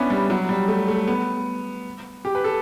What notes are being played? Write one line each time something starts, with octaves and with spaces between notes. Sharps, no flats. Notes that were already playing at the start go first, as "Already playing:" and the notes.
Already playing: B3 C#4 D4 E4
G3
F#3
G3
A3
A3
B3
G4
B4
A4